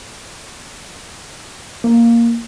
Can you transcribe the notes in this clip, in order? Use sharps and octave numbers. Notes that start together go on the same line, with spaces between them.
A#3